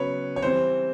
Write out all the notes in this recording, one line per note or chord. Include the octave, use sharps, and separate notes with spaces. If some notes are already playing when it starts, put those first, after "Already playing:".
Already playing: C#3 F#3 B3 B4 C#5
C#5
E3 G3 C4 C5